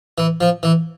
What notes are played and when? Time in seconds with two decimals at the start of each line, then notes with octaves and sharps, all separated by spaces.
0.18 E3
0.41 F3
0.63 E3